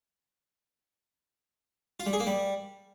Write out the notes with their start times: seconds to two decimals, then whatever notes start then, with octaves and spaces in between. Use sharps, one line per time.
2.00 F4
2.06 G3
2.13 G#4
2.20 A#3
2.27 G3